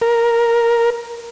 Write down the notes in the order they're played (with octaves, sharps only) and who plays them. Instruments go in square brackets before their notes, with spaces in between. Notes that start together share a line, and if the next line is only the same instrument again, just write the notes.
[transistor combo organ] A#4